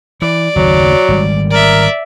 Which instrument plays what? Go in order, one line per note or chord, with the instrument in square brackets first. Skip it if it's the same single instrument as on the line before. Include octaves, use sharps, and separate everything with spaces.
[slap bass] E3 [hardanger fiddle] D5
[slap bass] F#1 D#2 [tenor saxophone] F#3
[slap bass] G#1 G3
[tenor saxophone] A#4 [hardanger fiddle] D5 E5